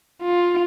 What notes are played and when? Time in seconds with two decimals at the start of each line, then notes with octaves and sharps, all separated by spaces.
0.23 F4